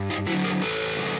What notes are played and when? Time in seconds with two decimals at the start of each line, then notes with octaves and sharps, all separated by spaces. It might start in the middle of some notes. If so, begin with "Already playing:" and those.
Already playing: G2
0.10 D#4 F4
0.26 F#3 E4 F#4
0.30 D3
0.44 G#4 A#4
0.61 E2 A4 B4
0.96 C#3 F3 G#3